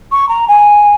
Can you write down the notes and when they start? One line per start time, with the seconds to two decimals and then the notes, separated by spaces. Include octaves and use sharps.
0.12 C#6
0.29 A#5
0.48 G#5